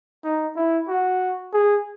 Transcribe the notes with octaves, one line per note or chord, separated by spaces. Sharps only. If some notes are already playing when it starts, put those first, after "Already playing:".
D#4
E4
F#4
G#4